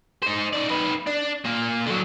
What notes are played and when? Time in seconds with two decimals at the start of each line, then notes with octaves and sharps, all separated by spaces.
0.22 D#4 C5
0.53 D#4 D5
0.69 D#4 B4
1.07 D4
1.45 A#2 A#3
1.86 D3 F#3